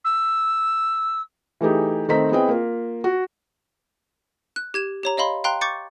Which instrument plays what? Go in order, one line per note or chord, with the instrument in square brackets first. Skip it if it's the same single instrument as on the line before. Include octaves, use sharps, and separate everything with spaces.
[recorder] E6
[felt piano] E3 A3 D#4 G4 G#4
D#3 A3 C4 D#5 A#5 B6
B3 C4 E4 G#4 D#5 G5
A#3 F4
F#4
[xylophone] F#6
G4 G#6 E7
G4 C#5 A#5
C#5 D#5 F5 B5 C6
F5 G5 A#5 C6 F#6
C#6 D6 G6 A6 C#7